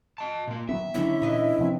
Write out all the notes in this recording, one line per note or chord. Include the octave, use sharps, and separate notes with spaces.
D#5 A5
A#2 A#3
D#3 F#3 B3 E5
D3 D#3 F#3 B3 C#4 E4
A#2 E3 D#5 A#5
C3 F3 C4